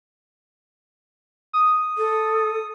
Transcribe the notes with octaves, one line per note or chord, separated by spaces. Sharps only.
D#6
A4